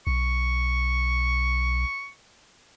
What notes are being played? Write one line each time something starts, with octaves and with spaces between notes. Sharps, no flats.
B1 C#6